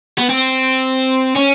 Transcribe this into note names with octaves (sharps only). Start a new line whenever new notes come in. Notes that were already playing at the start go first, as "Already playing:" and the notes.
B3
C4
C#4